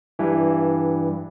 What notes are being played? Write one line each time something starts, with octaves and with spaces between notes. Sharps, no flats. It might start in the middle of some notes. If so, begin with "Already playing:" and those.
G2 E3